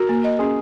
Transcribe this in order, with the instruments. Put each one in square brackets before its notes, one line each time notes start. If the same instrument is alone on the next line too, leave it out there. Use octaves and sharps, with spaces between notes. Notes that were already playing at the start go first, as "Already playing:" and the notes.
Already playing: [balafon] F#4 [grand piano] A#4
[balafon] A#3
D#5
[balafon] C#4 [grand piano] G#4